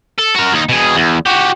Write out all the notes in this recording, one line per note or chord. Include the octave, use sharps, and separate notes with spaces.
A4
F#4 A#4
D#2 D#4
B2 G#4
E2
F#4 G4